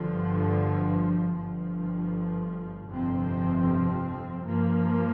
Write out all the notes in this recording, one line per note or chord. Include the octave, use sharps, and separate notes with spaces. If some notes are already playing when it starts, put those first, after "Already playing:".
Already playing: G1 G2 D3 F3
G1 G2 F3
G1 F2 C3 F3 C4
G2 F3 A#3